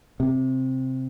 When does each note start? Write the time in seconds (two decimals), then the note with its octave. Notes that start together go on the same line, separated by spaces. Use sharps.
0.20 C3